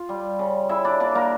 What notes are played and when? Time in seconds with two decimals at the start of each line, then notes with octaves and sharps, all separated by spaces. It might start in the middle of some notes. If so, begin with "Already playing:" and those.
Already playing: F4 F5
0.09 G3
0.39 C#3
0.69 C#3 E4 E5
0.85 D4 D5
1.00 A#3 D4 D5
1.15 A#3 A#4